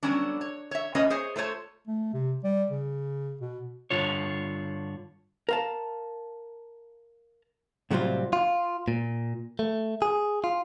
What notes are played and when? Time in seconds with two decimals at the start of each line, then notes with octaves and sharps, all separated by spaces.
0.03 D3 F#3 G3 B3 C#4 D4
0.41 C#5
0.71 C#5 E5
0.95 G#3 A#3 C#4 F4 B4 D#5
1.10 G#4 C5 C#5 G#5
1.36 A3 F4 C5 C#5 A5
1.88 A3
2.13 C3
2.44 G3
2.71 C#3
3.41 B2
3.90 G2 D3 F4 C#5
5.49 A#4 F5 A5
7.91 A2 C3 F#3 G3 C4 F4
8.33 F4
8.88 A#2
9.59 A3
10.02 G#4
10.44 F4